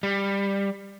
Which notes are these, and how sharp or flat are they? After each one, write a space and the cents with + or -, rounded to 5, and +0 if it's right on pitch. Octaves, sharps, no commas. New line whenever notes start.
G3 +15